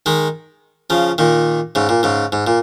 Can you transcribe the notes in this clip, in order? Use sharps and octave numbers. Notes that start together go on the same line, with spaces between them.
D#3 G#3
C#3 F3
A#2 D#3
G#2 C#3
A#2
G#2 C#3
G#2
A#2